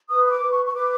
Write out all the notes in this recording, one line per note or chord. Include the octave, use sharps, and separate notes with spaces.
B4 D#6
D#6
D6
B4
C#6
C#6
B4 D6